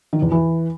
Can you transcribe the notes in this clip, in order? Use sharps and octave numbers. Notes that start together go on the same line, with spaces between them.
D#3
E2
E3